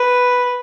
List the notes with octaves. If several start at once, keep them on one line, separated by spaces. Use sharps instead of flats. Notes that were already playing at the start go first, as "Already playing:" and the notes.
Already playing: B4